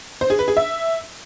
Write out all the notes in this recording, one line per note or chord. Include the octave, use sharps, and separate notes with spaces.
C5
G#4
B4
G#4
E5